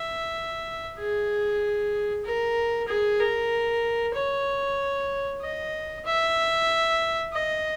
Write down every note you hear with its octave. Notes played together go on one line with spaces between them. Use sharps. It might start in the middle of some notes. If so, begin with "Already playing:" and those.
Already playing: E5
G#4
A#4
G#4
A#4
C#5
D#5
E5
D#5